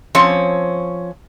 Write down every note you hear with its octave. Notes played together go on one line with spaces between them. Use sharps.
F3 C4 C#4 C#5